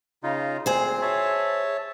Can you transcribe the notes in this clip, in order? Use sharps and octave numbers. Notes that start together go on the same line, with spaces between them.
C#3 D#4 F4
D2 A#2 C4 G#4 C5
C#5 E5 A5